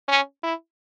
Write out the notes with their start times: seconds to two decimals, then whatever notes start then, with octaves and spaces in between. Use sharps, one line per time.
0.09 C#4
0.43 E4